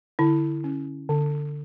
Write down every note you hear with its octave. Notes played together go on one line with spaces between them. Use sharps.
D3 E4
C#4
D3